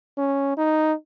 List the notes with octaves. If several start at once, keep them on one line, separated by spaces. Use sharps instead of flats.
C#4
D#4